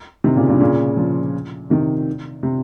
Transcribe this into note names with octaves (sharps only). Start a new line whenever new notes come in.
C3 D#3
A#2 C#3
G2 A#2
A#2 C#3
C#3 F3
C3 D#3
C3